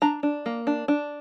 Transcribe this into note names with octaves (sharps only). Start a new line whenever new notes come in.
D4 A#5
D4
A#3
D4
D4